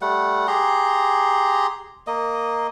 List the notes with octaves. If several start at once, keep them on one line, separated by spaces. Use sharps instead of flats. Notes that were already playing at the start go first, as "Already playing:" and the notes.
G3 A3 F#5
G4 G#4 A#5 C6
A#3 D#5